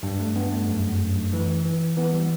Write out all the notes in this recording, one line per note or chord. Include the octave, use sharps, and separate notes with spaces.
G2 G3
A3
G2 B3
A3
F#2
F#2
E3
E3
E3 B3
G3